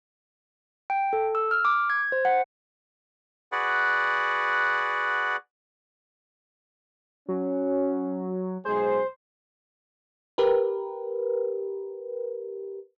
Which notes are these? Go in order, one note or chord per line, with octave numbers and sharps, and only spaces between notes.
G5
A4
E6
F6
D6
G#6
C5
F#5
F#4 G#4 B4 D5 F#5
F#3 C#4
B1 G#3 G#4 C5
G4 A#4 B4